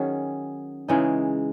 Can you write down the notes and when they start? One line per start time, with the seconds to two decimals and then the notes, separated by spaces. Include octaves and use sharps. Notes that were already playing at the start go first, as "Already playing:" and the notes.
Already playing: D#3 F#3 C#4 G#4
0.88 C#3 E3 G#3 D#4